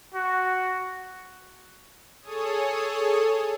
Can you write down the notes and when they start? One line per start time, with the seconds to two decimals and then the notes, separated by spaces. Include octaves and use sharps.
0.15 F#4
2.21 G#4 A4 C#5 D#6